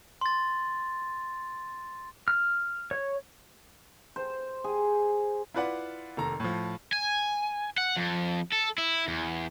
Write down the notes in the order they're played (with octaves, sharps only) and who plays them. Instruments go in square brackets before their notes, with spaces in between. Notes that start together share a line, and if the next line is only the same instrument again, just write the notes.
[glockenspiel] C6 A6
[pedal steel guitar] F6
C#5
[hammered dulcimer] C5
G#4
[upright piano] E4 F4 B4 D5 F#5
F1 D#3 A4 A#5
A2 F3
[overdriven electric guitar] G#5
F#5
F2
A4
E4
E2